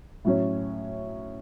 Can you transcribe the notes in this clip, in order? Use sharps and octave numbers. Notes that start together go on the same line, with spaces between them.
A2 F#3 C#4